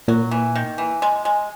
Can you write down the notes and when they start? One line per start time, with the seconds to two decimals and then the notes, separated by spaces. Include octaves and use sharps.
0.08 A#2 F#3
0.31 E3
0.55 D#3
0.78 E3
1.02 G#3
1.25 G#3